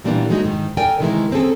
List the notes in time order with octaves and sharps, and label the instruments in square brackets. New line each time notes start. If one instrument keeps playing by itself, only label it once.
[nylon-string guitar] A#2 E3 G3 A#3 B3 D4
F#3 G#3 A3 D#4 F#4
G#2 D#3
A4 A#4 D5 G5 G#5
C3 D#3 E3 G#3 E4 A#4
A#3 C4 C#4 G#4 A4